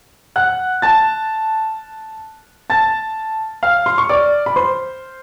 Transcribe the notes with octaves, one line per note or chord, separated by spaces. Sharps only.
F#5 F#6
A5 A6
A5 A6
F5 F6
C6
C#6
D5 D6
B5
C5 C6